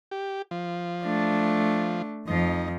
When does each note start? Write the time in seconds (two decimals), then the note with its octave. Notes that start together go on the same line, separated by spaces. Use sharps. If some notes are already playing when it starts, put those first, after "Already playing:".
0.11 G4
0.51 F3
1.05 A3 D4
2.28 F2 F3 D#4